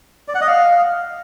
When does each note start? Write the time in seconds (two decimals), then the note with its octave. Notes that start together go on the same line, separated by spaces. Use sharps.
0.28 D5
0.35 F#5
0.41 D#5
0.48 F5